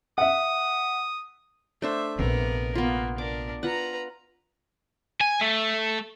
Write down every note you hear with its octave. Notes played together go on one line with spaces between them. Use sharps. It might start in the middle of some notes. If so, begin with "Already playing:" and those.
E5 F#5 D#6
A3 D4 C5 E5
A#1 C3 B3 A#4
A#3 B3 F4
D4 A#4 D6
F4 B4 F#5 A#5
G#5
A3